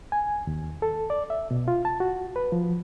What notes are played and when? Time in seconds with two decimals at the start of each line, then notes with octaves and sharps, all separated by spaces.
0.12 G#5
0.47 D#2
0.82 A4
1.10 D5
1.30 E5
1.51 B2
1.68 F4
1.85 A5
2.00 F#4
2.36 B4
2.52 F3